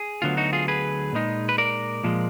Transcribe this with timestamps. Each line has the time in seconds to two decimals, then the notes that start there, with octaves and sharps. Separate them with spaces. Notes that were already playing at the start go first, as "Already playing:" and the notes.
Already playing: G#4
0.22 D2 D3 F#3 B3 F4
0.37 D#4 F#4
0.53 F4 G#4
0.68 G#4 B4
1.13 A#2 G#3 D#4
1.49 B4
1.58 A#4 D5
2.04 A#2 F3 G#3